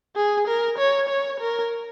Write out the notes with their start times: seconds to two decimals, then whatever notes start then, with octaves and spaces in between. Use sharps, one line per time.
0.16 G#4
0.47 A#4
0.78 C#5
1.08 C#5
1.40 A#4